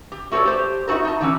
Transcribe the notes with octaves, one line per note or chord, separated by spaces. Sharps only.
G4
A3 F#4 A4 B4 C#5 D5
G4 C5
D#4 E4 F#4 A4 A#4
D#4 A5
D3 E3 F#3 C#4